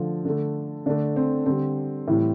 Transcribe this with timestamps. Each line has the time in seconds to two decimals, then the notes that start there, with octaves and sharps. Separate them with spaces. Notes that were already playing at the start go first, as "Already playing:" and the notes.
Already playing: D3 F3 A3
0.25 D3 A3
0.86 D3 A3 D4
1.16 C4
1.46 D3 G3 C4
2.08 A2 E3 G3